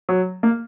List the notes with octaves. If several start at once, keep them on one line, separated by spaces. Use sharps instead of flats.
F#3
A#3